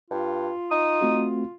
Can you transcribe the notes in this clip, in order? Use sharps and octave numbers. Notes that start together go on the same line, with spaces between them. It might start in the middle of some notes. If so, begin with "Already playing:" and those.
G2 F4
D#4 D#6
A3 C4 F#4